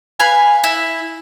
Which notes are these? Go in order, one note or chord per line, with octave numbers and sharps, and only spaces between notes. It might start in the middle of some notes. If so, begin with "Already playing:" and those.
B4 F5 G#5
E4